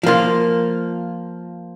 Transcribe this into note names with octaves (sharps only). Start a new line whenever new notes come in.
F3 A#3 F4